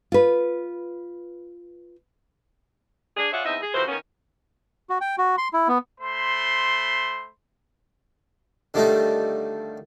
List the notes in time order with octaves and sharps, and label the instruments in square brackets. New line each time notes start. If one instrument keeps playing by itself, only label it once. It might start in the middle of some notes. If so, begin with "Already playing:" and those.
[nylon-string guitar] F4 B4
[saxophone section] D4 G#4
F4 G#4 C#5 D5 E5 F#5
E2 C4 D#4 D#5 E5
G#4
F2 C3 E3 F#4 C5
D#3 A#3 B3 C#4
[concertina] F#4
G5
F#4
C6
E4
B3
[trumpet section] A3 C5 B5 C6
[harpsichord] D3 D#3 G3 A3 D#4 F4